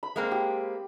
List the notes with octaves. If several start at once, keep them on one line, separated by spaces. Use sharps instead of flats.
B5
G#3 A#3 C4
G4